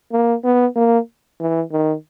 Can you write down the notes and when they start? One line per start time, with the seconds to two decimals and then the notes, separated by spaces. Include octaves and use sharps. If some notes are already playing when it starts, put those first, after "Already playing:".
0.12 A#3
0.44 B3
0.76 A#3
1.40 E3
1.72 D#3